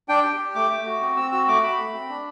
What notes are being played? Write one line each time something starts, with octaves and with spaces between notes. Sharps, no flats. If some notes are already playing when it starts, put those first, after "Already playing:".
D4 G5
G4
G4
A3 D6
A3
F#4
C4
C4 E6
F#4 E6
A3 D6
F#4 B5
A3
C4
D4